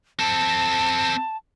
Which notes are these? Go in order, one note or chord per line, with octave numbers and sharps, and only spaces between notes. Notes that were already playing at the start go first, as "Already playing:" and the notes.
C4 A4 A5